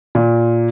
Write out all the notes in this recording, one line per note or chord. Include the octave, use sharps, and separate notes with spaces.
A#2